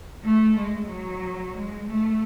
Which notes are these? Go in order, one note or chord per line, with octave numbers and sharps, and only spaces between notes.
A3
G#3
F#3
G#3
A3